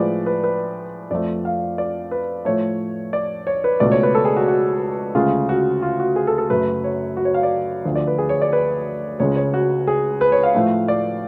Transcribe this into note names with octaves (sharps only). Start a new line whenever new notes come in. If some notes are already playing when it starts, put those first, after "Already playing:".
Already playing: A2 F3 G#3 B4 D5
B4
B4
F2 F3 A3 D5
F5
D5
B4
A2 F3 A3 C#5
D5
C#5
B4
C#2 B2 A3 D5
C#5
B4
A4
G#4
F#4
F#4
D2 C#3 G#3 F4
F#4
F4
F#4
G#4
A4
A4
F#2 C#3 F#3 A3 B4
C#5
F#4
C#5
F5
D5
D2 D3 F3
D5
B4
G#4
C#5
D5
B4
C#2 C#3 G#3 C#5
C#5
F#4
G#4
B4
C#5
F5
A2 F3 A3
D5